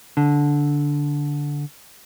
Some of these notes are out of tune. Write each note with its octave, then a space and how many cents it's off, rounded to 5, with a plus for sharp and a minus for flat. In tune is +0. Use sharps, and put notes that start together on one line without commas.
D3 -10